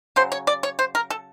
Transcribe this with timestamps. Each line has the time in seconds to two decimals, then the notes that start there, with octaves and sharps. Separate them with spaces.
0.16 C#3 F#3 C5
0.32 C#5
0.47 D5
0.63 C#5
0.79 C5
0.95 A#4
1.10 A4